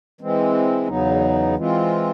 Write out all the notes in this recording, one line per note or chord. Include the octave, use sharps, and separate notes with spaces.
E3 G#3 C4
E2 C#3 F#3 B3 D#4
E3 G#3 C4 F4